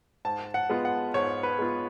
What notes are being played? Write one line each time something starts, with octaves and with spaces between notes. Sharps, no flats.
G#2 A5
F#5
G#3 B3 F4
F#5
G#2 C#5
B4
G#3 B3 F4